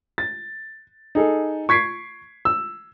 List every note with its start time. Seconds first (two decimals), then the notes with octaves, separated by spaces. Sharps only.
0.18 A6
1.15 D#4 G#4 A4
1.69 C#6 G#6 B6 C7 D7
2.45 E6